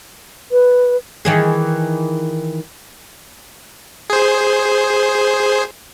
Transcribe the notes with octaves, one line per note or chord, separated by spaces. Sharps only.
B4
D#3 E3 G#4
G#4 C5